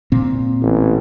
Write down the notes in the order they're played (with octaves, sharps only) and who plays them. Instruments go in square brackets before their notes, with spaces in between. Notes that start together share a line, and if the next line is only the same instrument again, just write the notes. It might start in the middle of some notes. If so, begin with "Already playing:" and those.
[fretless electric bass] A#2 C4
[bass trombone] A1